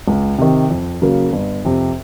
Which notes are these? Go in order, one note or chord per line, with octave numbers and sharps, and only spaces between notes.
C#2
C3 D#3
F2
C#3 F#3 A#3
G1
F2 C3